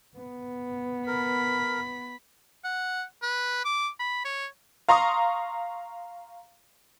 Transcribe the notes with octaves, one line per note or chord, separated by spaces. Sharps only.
B3
A#4 B5
F#5
B4
D6
B5
C#5
F5 A#5 C6 C#6 D#6